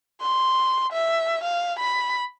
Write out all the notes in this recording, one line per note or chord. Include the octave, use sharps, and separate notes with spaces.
C6
E5
F5
B5